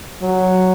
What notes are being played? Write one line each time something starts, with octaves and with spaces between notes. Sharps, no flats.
F#3